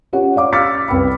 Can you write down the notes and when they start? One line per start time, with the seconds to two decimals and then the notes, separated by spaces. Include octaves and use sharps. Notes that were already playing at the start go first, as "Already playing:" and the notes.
0.13 C#4 F4 G4 C#5 F#5
0.36 D5 F5 D6
0.53 D6 E6 F6 A6 B6 C#7
0.88 C2 B4 G5 B5